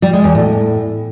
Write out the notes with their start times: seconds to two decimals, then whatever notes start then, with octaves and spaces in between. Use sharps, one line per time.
0.02 G3
0.13 G#3
0.24 E2
0.35 A2